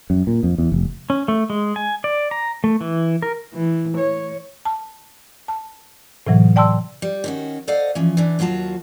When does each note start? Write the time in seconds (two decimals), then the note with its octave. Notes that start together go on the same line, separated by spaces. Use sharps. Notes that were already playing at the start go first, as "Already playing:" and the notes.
0.10 F#2
0.27 A#2
0.43 F2
0.58 E2
0.72 F1
1.10 C#4
1.28 A3
1.50 G#3
1.76 G#5
2.04 D5
2.31 A#5
2.64 A3
2.81 E3
3.22 A#4
3.54 E3
3.98 C#5
4.65 A5
5.48 A5
6.27 A2 C3 E3 F#3
6.56 D5 G5 A5 C6 E6
7.02 G3
7.24 D#3 C#4 F#4
7.68 A4 C5 D5 D#5 F5 F#5
7.95 E3 F3 C#4
8.17 E3 D4
8.39 D#2 F#3 F4 F#4 A5